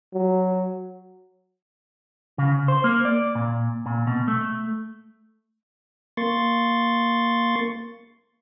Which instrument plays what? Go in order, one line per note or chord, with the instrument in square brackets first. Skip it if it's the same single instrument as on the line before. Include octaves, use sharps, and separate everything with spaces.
[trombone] F#3
[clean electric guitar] C#3
C5
A#3
D5
A#2
A#2
B2
A3
[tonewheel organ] A#3 C6 C#6 A6